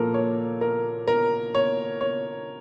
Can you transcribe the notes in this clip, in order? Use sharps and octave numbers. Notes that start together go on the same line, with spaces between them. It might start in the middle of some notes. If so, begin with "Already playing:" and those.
Already playing: A#2 F3 A#3 A4 A#4
C#5
A#4
A#4
C#5
C#5